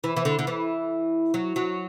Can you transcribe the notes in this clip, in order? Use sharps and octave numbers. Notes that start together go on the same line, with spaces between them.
E3
E3
D3
D3
E3
F#3
F#3